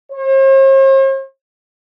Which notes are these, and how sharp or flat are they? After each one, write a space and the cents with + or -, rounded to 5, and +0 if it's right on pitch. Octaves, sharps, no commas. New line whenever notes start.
C5 +45